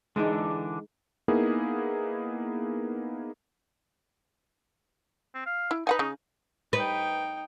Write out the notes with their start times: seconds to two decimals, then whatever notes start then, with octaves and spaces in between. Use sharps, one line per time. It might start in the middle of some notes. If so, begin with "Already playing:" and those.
0.16 D3 E3 G#3 D4 D#4
1.28 A#3 B3 D#4 E4 G#4 A#4
5.34 C4
5.46 F5
5.71 E4
5.87 D#4 B4 F#5 G#5
5.99 C#3
6.73 D#4 B4 G5